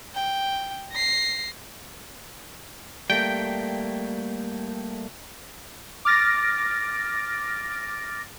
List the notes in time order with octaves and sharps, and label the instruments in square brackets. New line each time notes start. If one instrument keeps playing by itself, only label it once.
[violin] G5
A#6 C7
[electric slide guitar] G3 A3 A#3 [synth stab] G5
[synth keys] D6 F6 A6 A#6 D7